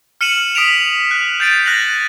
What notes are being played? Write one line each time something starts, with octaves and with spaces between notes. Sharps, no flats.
F6 C#7 D#7 E7 F#7
D#6 B6 D7 F7
F#6
G6 A6 C7 D7 D#7
F#6 A#6 F#7